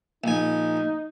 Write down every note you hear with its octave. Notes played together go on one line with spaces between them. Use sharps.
A#1 D#4 G#5